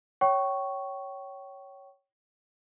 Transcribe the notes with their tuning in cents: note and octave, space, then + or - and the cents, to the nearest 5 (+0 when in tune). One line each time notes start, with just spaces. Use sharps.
C#5 +0 G5 -30 C#6 +0